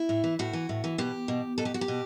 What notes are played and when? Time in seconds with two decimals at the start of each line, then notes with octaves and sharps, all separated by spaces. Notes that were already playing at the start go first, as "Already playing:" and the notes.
Already playing: E4
0.09 A2
0.24 E3
0.39 A2 F#4
0.53 E3
0.69 A2
0.84 E3
0.98 B2 G4
1.28 B2
1.58 B2 A4
1.65 G4
1.74 F#4
1.81 G4
1.88 B2